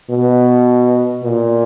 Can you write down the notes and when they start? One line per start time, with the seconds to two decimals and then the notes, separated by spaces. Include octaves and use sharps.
0.10 B2
1.24 A#2